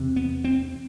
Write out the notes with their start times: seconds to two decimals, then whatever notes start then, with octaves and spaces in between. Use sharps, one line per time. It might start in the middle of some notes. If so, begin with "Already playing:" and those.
Already playing: E2 C3
0.16 B3
0.44 C4